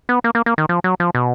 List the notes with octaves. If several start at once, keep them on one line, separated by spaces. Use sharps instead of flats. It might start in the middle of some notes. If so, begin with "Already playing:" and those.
B3
A#3
A#3
A#3
D#3
F3
F#3
F3
B2